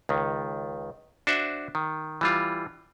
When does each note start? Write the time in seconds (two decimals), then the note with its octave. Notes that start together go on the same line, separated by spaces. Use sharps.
0.09 C#2 D#3
1.27 D4 F#4 C5 E5
1.75 D#3
2.21 E3 G3 F4